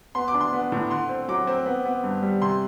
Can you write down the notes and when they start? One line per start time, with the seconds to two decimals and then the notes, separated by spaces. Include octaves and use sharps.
0.15 B3 C6
0.28 D6
0.34 D4
0.41 C6
0.53 B3
0.72 A2
0.90 D3 C6
1.09 C4
1.28 F#3 D6
1.47 C4
1.66 B3
1.85 B3
2.04 G2
2.22 G3
2.41 C3 C6